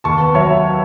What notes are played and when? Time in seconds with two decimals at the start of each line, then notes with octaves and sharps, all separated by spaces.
0.04 D#2 A5 C#6
0.19 B3
0.34 F#3 C#5 E5
0.50 F#3